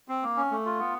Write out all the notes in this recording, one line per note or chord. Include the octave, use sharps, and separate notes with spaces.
C4
A#3
C#4
A3
F4
B3